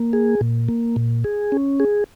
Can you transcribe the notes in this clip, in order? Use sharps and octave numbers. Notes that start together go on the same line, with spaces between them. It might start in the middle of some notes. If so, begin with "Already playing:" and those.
Already playing: A#3
G#4
A#2
A#3
A#2
G#4
C#4
G#4